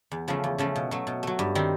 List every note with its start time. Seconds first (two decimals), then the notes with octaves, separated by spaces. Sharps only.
0.11 E2
0.28 C#3 F3 A3
0.44 E2
0.58 C#3 F3 A3
0.76 B2
0.91 F#3 A3
1.07 B2
1.23 F#3 A3
1.39 G2
1.55 D#3 G3 C4